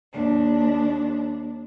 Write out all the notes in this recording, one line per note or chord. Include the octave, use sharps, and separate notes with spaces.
D#2 D4